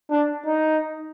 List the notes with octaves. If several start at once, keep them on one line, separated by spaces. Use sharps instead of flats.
D4
D#4